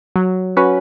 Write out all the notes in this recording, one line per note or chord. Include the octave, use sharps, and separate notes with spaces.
F#3
C#4 F#4 B4